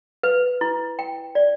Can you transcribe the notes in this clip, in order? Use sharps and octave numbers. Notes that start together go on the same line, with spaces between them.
B4
E4
G5
D5